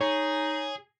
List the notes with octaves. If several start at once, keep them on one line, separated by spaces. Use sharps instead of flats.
D#4 G#4 C#5